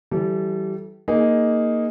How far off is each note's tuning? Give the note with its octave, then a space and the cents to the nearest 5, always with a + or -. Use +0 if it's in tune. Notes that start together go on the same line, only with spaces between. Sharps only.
E3 +0 G3 -30 A4 -20
A#3 +0 D#4 +0 G#4 +0